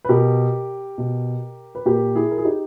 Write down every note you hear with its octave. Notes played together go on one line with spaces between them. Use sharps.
B4
B2 G4 A#4
B2
B4
A#2 G4 A#4
E4 G#4
A#4
G#4
D#4 G4